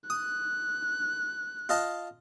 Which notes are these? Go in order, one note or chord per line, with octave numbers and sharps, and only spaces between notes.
D#6 F#6
F4 D#5 A5